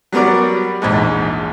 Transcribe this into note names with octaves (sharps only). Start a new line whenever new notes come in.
F#3 G3 B3 A#4 D5
A#1 E2 G#2